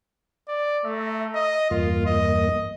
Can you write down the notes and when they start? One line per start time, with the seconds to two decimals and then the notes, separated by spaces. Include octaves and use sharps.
0.48 D5
0.85 A3 E5 A#5
1.35 D#5
1.71 E2 G2 A#3 F4
2.06 D#5